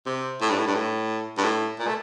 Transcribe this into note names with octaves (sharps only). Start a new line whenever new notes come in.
C3
A2
G2
A2
G2
A2
G2
A2
A#2
A3